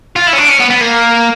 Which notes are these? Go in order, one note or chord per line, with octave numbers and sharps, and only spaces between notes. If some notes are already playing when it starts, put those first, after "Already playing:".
F4
E4
C#4
D4
C#4
B3
B3
A#3